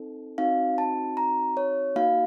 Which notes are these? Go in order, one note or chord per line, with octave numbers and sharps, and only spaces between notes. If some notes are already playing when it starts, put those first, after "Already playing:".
Already playing: C4 D#4 A4
C4 D#4 F#4 F5
A5
A#5
C#5
A#3 D#4 F#4 F5